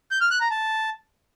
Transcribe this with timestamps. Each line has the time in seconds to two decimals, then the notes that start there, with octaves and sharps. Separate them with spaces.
0.11 G6
0.21 F6
0.31 F#6
0.41 A#5
0.51 A5